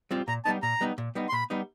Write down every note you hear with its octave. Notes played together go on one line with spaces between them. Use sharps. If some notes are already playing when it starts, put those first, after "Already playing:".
G3 C4 F4
A#2 A#5
G3 B3 D#4 A5
A#2 A#5
G3 B3 D#4
A#2
G3 B3 D#4
C6
A#2 B5
G3 B3 D#4